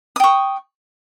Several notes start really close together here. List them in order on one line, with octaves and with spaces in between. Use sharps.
D#6 G5 C#6